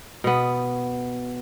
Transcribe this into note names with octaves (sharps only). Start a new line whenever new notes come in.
B2 B3